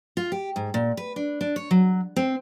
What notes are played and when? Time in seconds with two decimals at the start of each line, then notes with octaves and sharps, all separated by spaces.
0.17 F4
0.32 G4
0.56 G#2
0.74 A#2
0.97 B4
1.16 D4
1.41 D4
1.56 C#5
1.71 F#3
2.16 C4